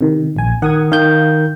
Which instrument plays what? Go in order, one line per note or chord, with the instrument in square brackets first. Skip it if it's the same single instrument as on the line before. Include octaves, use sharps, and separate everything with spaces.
[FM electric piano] C3 D#3
A#1 G#5
[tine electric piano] D#3 [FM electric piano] F#5 D#6 G#6
[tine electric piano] D#3 G6 [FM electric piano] F5